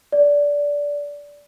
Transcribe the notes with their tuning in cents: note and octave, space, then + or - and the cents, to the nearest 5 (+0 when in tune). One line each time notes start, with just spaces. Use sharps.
D5 -15